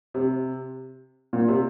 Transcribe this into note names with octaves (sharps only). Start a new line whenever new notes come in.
C3
A#2
C3